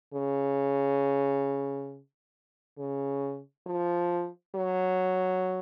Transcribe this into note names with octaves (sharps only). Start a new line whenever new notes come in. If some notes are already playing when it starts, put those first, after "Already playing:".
C#3
C#3
F3
F#3